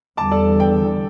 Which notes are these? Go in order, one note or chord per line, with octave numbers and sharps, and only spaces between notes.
E2 D3 G3 A5 D6
A4 D5
D5 G5